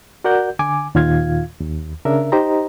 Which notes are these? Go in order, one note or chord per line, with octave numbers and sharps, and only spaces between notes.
F#4 A#4 D5 F#5 G6
D3 G#5 D6
D#2 A#2 D#3 F4 F5 G#6
D#2
C#3 D4 A#4 E5
D#4 G4 C5 D#5 A#5